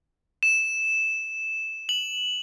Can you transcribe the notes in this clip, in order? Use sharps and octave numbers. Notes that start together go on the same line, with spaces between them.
E7
F#7